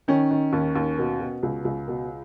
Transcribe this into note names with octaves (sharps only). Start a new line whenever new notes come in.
D#3 C#4
D#3
D#2
D#2
B2
B2
C#2
C#2
B2